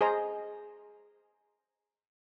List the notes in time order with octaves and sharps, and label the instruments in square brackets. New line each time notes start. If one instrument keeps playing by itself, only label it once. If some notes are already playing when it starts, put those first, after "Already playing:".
[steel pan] G#4 C5 D#5 A#5